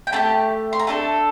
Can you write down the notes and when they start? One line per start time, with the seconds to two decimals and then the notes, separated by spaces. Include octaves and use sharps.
0.07 G5
0.12 A3 D4 G4 A5
0.73 C6
0.79 A#5
0.87 A3 D4 A4 A5